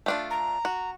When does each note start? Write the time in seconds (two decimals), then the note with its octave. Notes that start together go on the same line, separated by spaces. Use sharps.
0.06 A3 D4 F4
0.30 A#5
0.65 F#4